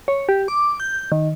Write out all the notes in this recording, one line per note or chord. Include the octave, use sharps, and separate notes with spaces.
C#5
G4
D6
G6
D#3